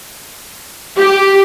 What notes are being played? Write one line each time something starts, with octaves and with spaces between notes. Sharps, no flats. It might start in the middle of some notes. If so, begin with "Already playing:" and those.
G4